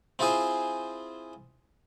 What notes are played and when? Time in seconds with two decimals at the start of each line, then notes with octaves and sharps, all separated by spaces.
0.19 C4 E4 F4 G#4 C5 G#5